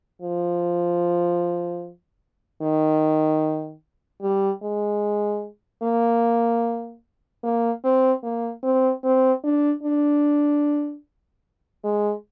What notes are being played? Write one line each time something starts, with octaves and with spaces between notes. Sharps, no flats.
F3
D#3
G3
G#3
A#3
A#3
C4
A#3
C4
C4
D4
D4
G#3